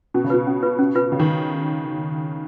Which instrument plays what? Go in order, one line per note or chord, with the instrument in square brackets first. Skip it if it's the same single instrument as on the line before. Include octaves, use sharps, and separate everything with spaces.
[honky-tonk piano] B2 [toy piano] C#4
[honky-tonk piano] C#3
[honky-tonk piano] B2 [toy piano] F4 B4
[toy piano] C#4
F4 B4
C#4
F4 B4
[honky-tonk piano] C#3 [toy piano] C#4
[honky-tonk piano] D#3